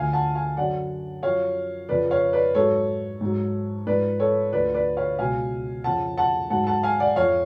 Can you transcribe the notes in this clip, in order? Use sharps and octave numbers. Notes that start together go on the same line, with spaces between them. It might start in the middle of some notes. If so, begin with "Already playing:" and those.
Already playing: D2 D3 F3 F5 G#5
F#5 A5
F5 G#5
F#2 D3 F#3 D5 F#5
F#2 F3 C#5 F5
F2 C#3 F3 B4 D5
C#5 F5
B4 D5
G#2 F#3 A4 C#5
G#2 F#3
G#2 F3 B4 D5
A4 C#5
D2 D3 F3 B4 D5
B4 D5
C#5 F5
C#2 B2 F#3 F5 G#5
F2 C#3 F3 F#5 A5
F#5 A5
G#2 F#3 F#5 A5
F#5 A5
F5 G#5
D5 F#5
F2 F3 C#5 F5